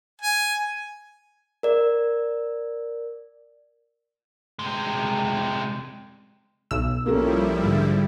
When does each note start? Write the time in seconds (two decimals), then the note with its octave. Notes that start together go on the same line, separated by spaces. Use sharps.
0.21 G#5
1.63 A#4 D5
4.59 C3 G#3
6.71 B1 E6
7.06 F3 G3 A#3 C#4 E4 A4
7.58 G#2 D3